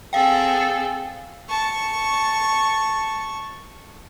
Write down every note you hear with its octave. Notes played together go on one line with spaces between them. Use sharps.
C4 G#4 A4 F5 G5
A5 C#6